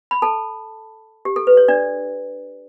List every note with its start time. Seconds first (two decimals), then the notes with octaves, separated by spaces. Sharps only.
0.11 B5
0.22 A4 A5
1.25 G4
1.36 A4
1.47 B4
1.57 C#5
1.68 D4 D5